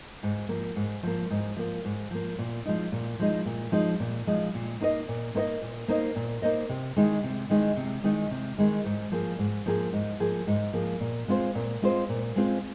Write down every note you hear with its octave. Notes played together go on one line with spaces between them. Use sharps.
G#2
F3 A#3
G#2
F3 A#3
G#2
F3 A#3
G#2
F3 A#3
A#2
F3 G#3 D#4
A#2
F3 G#3 D#4
A#2
F3 G#3 D#4
A#2
F3 G#3 D#4
A#2
A#3 D#4 C5 D#5
A#2
A#3 D#4 C5 D#5
A#2
A#3 D#4 C5 D#5
A#2
A#3 D#4 C5 D#5
C3
D#3 G#3 D#4
C3
D#3 G#3 D#4
C3
D#3 G#3 D#4
C3
D#3 G#3 D#4
G#2
F3 A#3 G#4
G#2
F3 A#3 G#4
G#2
F3 A#3 G#4
G#2
F3 A#3 G#4
A#2
G#3 C4 F4 C5
A#2
G#3 C4 F4 C5
A#2
G#3 C4 F4 C5